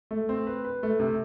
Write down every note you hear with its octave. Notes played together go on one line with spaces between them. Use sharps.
A3
C4
B4
B4
A3
C3